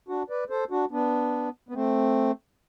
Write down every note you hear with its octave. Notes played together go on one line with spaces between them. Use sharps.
D4 F#4
B4 D5
A4 C5
D4 F#4
B3 D4
B3
A3 C4